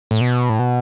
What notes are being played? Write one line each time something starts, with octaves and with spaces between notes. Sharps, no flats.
A2
B2
A2
B2